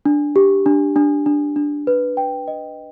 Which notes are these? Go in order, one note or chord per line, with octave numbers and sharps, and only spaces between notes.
D4
G4
D4
D4
D4
D4
B4
G5
D#5